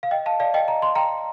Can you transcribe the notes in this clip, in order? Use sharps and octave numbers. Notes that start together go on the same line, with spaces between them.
F5
D#5 G5
F5 A5
D5 F5
D#5 G5
A#5
C6
G5 A#5